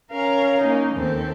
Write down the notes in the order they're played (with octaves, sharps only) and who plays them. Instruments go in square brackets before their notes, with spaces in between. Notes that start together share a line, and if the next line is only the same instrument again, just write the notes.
[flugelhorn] C#4 [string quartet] A#4 F5 A#5
[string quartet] A#3 D#4
D#2 C4 A4